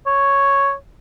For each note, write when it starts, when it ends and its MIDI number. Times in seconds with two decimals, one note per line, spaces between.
0.06 0.73 73